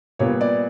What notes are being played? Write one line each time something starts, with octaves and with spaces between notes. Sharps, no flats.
A#2 G3 B3 C#5
D5